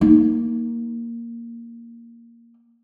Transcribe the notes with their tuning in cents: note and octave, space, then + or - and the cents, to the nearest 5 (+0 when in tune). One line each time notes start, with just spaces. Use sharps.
A#3 +0 D#4 +10